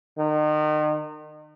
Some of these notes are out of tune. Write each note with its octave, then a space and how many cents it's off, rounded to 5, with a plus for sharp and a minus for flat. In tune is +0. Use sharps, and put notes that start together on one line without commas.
D#3 -35